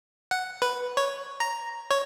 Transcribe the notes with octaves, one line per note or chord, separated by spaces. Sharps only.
F#5
B4
C#5
A#5
C#5